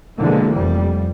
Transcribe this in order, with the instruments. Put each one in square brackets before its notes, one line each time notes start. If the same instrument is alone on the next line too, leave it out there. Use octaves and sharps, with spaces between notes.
[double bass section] B2 D3 E3 F3 G#3 A#3
F1 F2 G3